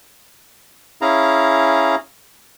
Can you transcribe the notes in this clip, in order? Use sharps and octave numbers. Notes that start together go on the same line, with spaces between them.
C#4 E4 G#4 F5 A#5